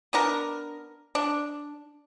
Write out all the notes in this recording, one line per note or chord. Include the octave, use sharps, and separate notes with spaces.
B3 D4 A#4
D4